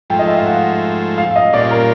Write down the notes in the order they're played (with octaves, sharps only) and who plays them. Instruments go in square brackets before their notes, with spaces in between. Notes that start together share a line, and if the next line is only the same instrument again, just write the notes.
[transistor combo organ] G#2 F3 A3 [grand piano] G5
[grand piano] D#5
E5
F5
F#5
F5
D#5
[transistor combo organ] A#2 G3 A#3 C#4 F4 [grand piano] D5
[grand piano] A#4